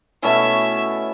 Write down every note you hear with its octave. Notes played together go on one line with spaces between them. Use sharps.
B2 A3 C#4 E4 E5